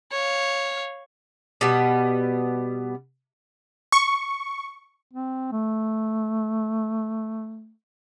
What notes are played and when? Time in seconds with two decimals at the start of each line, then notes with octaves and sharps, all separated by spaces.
0.12 C#5 F5
1.61 B2 G3 B3
3.92 C#6
5.13 C4
5.52 A3